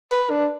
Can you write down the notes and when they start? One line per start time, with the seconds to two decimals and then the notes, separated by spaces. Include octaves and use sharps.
0.12 B4
0.30 D4